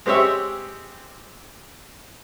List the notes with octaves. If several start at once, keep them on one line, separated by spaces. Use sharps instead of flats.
G#3 C4 G4 C#5 E5